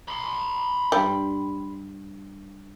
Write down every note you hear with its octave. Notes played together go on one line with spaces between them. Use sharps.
B5 C6
G2 G3